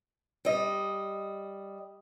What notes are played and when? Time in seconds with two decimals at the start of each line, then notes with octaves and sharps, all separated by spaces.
0.45 G3 D#5